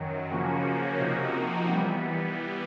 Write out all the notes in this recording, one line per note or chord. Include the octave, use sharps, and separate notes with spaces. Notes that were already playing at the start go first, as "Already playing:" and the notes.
Already playing: F#2 D#3 F#3
C#3 F3 A#3 C#4 F#4
C3 F3 A#3 D#4 F#4
E3 G3 B3